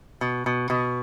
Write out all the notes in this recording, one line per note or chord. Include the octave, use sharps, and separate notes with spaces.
B2
B2
B2